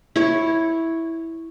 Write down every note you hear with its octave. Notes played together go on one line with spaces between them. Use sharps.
E4 C#5